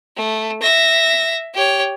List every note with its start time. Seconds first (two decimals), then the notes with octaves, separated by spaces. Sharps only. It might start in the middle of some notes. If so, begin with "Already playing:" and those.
0.16 A3
0.62 E5 A#6
1.54 G4 C#5